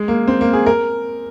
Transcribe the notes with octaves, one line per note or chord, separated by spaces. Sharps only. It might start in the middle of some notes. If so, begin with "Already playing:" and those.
Already playing: G#3
A#3
C4
A#3
G#4
A#4